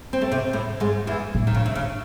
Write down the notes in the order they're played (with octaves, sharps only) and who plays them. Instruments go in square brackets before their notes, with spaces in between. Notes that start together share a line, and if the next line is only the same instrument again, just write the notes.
[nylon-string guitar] C4
A3
C3 C4
A2 A3
G#2 G#3
E2 E3
[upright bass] A2
[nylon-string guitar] D#3
C#3
C3
C#3